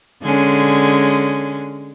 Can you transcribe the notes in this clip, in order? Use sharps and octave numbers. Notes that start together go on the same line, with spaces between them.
D3 G#3 C#4